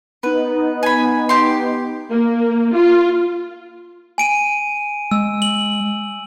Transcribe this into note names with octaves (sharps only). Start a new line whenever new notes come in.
B3 D#4 B4
G#5 B5
G4 C6
A#3
F4
G#5 D7 D#7
G#3 E6
F#7